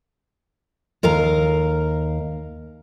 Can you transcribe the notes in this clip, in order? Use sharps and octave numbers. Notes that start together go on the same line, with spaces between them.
D#2 A#4 F5 A#5